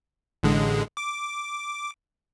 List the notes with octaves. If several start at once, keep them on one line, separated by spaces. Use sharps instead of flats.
A1 D3 G#3
D6